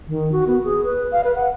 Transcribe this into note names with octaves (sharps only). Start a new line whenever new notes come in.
D#3
F#4
B3
G#4
B4
F5
B4
F#5